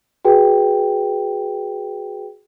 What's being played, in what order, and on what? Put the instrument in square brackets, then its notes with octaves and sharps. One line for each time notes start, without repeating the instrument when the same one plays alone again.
[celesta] F#4 G#4 B4 G5